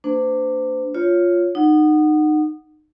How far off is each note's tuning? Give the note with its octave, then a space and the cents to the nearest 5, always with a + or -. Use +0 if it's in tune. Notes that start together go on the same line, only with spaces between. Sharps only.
A#3 -45 D4 +0 C5 -35
F4 +0 C#5 +0
D#4 -25 F#5 +0